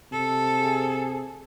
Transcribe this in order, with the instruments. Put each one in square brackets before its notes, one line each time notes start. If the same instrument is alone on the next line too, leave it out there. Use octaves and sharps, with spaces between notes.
[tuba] C3 [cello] A4
[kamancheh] G#4